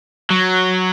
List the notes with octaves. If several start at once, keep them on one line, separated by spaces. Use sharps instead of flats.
F#3